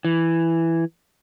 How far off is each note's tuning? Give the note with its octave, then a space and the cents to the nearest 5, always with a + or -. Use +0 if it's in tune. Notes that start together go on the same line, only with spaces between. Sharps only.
E3 +5